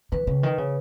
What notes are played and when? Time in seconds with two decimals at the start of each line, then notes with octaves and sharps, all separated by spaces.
0.12 D#3 B4
0.27 C#3
0.43 D#3
0.58 C#3